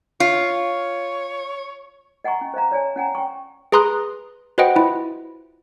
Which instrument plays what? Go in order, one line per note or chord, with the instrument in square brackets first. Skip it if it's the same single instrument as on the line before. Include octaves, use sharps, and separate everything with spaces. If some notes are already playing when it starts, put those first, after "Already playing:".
[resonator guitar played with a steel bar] F4 [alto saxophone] C#5
[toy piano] D#5 F#5 G#5 A#5 C#6
C#4
C5 D#5 F5 A#5
C#5 D5 G#5 A5
C#4 F#5 G#5 A#5
G5 C#6
[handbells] G#4 B4 A#5 C6 D#6 F#6
F#4 B4 C5 D#5 F#5 G5
E4 F4